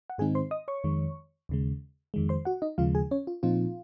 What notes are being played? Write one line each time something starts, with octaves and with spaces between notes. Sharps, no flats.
F#5
G#2 D#3 G#3 C4 D#4 G#4 G#5
C5 C6
D#5 D#6
C#5 C#6
F2 D#3 G#3
D#2 C#3 G#3
F2 D#3 G#3
C5 C6
F#4 F#5
D#4 D#5
D#2 C#3 F3 G#3 F4 F5
G#4 G#5
C#4 C#5
F4
A#2 F3 C4 D#4 F4